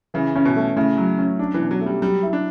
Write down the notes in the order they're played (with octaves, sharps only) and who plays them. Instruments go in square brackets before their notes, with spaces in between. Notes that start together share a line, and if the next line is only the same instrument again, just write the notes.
[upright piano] C#3 [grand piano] E3
[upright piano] C#3 [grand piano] C#4
[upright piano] B2
[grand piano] A3
[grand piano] A2 [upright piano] C#3
[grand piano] F#3
C#4
D4
[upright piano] E3
[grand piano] B2
[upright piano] F#3
[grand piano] A3
[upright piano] G3
[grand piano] F#3 [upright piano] G3
[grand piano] E4
[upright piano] D4